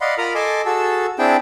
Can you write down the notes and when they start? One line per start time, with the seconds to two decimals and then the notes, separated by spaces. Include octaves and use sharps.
0.01 D5 D#5 F5 F#5 B5 C6
0.18 F4 A#4 A#5 B5 D#6 F6
0.35 A4 D#5 G#5 A5 C6 D6
0.65 F#4 G#4 A4 A5 E6
1.19 C4 D4 E4 G#4 G5 A5